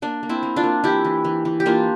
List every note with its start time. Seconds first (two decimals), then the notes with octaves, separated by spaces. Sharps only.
0.02 A#3 D4
0.23 A#3
0.29 C4 E4
0.43 A#3
0.56 D4 F4
0.64 A#3
0.84 E3 E4 G4
1.04 E3
1.25 E3
1.45 E3
1.60 G4
1.66 A#3 D4 F4